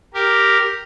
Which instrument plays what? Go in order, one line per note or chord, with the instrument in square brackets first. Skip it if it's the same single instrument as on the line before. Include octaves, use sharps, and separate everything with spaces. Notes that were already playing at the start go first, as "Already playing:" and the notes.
[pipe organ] G4 A#4